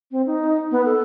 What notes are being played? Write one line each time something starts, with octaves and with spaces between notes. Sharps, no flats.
C4
D#4
B3
A4